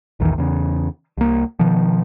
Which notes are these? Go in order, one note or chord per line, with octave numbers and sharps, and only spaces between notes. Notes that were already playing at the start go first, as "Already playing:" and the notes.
A#1 E2 D#3 E3
E2 C#3
C2 A#3
B2 D#3 F3